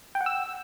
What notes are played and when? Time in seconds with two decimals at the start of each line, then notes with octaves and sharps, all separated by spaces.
0.15 G5
0.21 F#5
0.26 E6